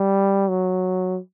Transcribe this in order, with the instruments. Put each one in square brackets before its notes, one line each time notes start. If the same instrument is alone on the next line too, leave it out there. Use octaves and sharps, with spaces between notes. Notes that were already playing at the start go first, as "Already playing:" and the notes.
Already playing: [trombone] G3
F#3